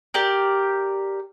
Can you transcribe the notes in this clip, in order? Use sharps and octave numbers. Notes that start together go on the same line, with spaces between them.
G4 A#4 D5